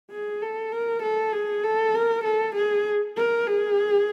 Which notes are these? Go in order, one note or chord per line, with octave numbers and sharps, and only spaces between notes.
G#4
A4
A#4
A4
G#4
A4
A#4
A4
G#4
A#4
G#4